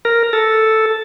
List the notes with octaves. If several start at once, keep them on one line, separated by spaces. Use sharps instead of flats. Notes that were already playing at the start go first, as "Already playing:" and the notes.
A#4
A4